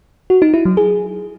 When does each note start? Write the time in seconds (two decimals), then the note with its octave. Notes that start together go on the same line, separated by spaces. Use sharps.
0.30 F#4
0.42 D#4
0.54 E4
0.65 F#3
0.77 G#4